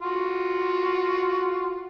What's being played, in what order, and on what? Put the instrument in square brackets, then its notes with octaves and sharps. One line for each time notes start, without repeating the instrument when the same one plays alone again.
[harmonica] F4 F#4